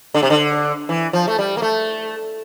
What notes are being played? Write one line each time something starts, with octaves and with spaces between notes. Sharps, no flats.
D3
C3
D3
E3
F3
A3
G3
A#3
A3